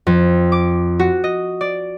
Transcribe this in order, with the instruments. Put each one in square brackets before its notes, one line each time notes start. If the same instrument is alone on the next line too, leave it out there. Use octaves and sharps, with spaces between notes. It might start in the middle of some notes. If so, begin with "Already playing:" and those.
[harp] F2
D6
F#4
D#5
D5